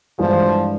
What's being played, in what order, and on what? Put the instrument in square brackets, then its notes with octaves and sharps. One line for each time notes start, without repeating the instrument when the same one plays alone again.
[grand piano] G2 E3 G#3 [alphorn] F3